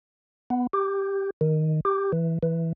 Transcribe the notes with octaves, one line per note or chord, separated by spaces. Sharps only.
B3
G4
D#3
G4
E3
E3